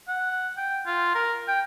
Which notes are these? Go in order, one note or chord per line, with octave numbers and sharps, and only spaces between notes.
F#5
G5
F4
A#4
G5